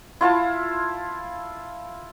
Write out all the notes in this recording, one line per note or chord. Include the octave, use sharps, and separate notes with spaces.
E4 F4 F5 A5